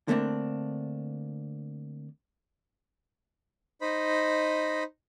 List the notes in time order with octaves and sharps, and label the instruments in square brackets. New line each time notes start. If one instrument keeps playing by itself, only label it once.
[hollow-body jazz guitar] D3 A3 A#3 C4 D4
[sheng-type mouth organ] D#4 C5 D#5 B5